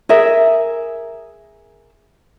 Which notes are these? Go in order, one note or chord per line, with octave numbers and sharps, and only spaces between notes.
G#4 A#4 E5